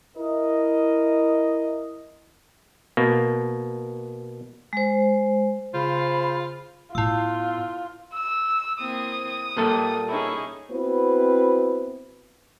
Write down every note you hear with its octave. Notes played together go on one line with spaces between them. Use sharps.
E4 A#4 D#5
B2 A#3
G#3 C5
C#3 F4 C5 B5
A2 B3 E4 F4 E6
E6
A#3 C4 E4 D#6
A#2 G3 A#3 A4
C#4 D#4 E4 G#4
B3 C4 E4 F#4 B4 C5